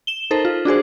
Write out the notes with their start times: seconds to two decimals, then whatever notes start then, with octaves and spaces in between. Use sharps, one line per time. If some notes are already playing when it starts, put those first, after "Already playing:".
0.07 E7 G7
0.31 D#4 A4 A#4 C5
0.45 F4
0.65 D4 F#4 G#4 C5